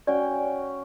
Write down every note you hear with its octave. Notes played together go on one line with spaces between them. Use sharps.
C#4 F#4 D5 G5